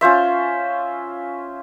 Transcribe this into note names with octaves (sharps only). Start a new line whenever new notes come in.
C#4 F4 C5 E5